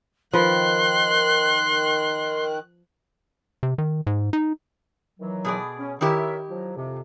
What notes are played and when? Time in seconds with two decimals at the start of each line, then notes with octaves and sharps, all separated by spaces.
0.33 D#3 F3 B4 C6 F#6
3.63 C3
3.78 D#3
4.07 G#2
4.33 D#4
5.20 D#3 E3 F#3
5.45 B2 G#4 D5
5.79 C#4
6.01 D#3 E4 G4 A#4 C#5 E5
6.50 F3 F#3
6.76 F2 C3